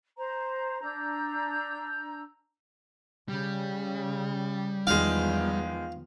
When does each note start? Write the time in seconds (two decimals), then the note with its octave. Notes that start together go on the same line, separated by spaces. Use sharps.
0.17 C5 A#5
0.81 D4 A#5 E6 G6
3.28 C#3 G3
4.87 E2 D#3 F3 G#3 F5